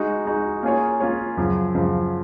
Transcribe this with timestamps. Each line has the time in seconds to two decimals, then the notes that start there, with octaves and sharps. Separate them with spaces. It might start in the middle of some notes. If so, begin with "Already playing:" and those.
Already playing: G#3 D#4 F#4
0.25 G#3 D#4 F#4
0.63 A#3 C#4 F4 G#4 C#5
1.00 A#3 C#4 F4 G#4 C#5
1.37 F#2 C#3 F3
1.75 F#2 C#3 F3